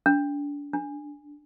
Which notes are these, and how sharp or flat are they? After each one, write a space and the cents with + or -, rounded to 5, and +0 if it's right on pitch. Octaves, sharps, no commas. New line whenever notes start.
D4 -30
D4 -5